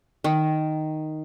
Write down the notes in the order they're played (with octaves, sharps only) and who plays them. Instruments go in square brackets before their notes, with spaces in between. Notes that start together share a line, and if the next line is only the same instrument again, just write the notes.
[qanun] D#3